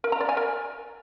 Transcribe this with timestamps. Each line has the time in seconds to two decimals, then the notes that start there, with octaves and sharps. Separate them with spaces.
0.04 A#4
0.12 A#5
0.20 D5
0.29 G#5
0.37 A#4